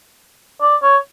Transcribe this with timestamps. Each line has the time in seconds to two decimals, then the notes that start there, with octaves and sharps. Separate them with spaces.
0.61 D5
0.82 C#5